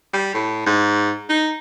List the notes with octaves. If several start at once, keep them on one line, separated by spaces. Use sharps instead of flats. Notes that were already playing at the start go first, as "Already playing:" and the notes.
G3
A2
G#2
D#4